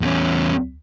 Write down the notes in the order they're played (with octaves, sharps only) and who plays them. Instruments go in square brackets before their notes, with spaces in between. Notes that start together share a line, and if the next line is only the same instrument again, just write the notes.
[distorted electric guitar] E2 C#4